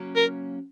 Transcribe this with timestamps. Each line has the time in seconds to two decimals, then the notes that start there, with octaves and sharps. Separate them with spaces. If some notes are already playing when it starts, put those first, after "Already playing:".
Already playing: C#3 F#3 A#3 C#4
0.16 A#4